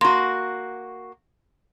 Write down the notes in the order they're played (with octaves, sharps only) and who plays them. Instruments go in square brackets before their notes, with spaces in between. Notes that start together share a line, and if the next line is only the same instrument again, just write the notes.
[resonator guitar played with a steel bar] A#3 F#4 [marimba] C6